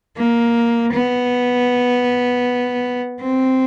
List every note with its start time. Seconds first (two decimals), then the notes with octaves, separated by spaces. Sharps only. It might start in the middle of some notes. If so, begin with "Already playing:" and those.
0.17 A#3
0.93 B3
3.22 C4